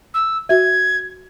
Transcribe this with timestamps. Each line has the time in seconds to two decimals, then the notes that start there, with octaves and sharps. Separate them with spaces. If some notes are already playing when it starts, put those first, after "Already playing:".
0.14 E6
0.49 F#4 E5 G#6